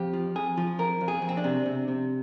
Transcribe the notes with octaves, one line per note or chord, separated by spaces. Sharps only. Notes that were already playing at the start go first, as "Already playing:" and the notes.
Already playing: F2 G4
F3
F2 G#4
F3
F2 A#4
F2
G#4
F2
C4
D4
C3
C3
C3